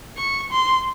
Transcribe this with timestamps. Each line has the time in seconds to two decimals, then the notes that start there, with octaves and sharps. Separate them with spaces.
0.17 C#6
0.51 C6